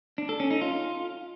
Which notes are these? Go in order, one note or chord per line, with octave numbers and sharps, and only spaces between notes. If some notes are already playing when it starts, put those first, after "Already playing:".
D4
A4
C#4
D#4
F4